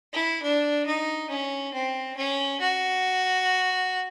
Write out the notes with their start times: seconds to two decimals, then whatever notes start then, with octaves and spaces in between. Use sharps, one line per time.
0.13 E4
0.43 D4
0.86 D#4
1.30 C#4
1.74 C4
2.17 C#4
2.61 F#4